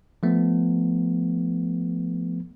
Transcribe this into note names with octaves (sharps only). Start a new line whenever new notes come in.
F3 A3 B3